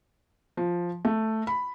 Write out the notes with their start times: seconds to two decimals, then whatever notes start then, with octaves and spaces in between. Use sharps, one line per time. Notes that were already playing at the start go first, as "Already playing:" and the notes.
0.57 F3
1.05 A3
1.47 B5